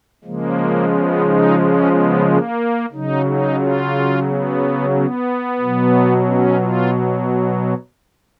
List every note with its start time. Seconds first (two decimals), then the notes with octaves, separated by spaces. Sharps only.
0.24 C#3 F3 G#3 A#3
0.92 B3
1.25 D#4
1.58 C#4
1.92 B3
2.25 A#3
2.92 C#3 F#3 D#4
3.26 D#4
3.59 F4
4.25 B3
4.93 B3
5.60 B2 F#3
6.27 C#4
6.60 F4